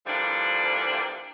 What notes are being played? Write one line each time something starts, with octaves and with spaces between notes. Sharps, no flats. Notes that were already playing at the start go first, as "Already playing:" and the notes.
D3 E3 F3 G3 A#3 D4